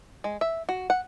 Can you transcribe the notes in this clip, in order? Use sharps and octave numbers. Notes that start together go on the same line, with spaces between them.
G#3
E5
F#4
F#5